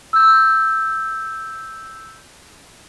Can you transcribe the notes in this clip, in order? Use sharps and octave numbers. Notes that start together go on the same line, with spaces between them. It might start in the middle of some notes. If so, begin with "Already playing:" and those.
E6 G6